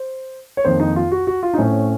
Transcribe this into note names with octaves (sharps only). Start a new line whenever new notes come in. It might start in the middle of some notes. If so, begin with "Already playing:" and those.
Already playing: C5
C#5
F2 D#3 A#3 C5
D#4
F4
F#4
F#4
F4
D#4
A2 A3 C4 C#4